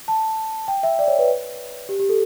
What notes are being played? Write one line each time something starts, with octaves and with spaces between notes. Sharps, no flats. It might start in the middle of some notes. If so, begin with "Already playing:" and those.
A5
G5
E5
D5
C#5
B4
G4
G4
A4